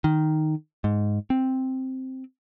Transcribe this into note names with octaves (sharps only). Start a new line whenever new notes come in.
D#3
G#2
C4